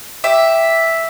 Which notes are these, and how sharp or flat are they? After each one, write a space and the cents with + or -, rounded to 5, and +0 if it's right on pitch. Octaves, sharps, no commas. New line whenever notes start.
G4 +0 E5 +0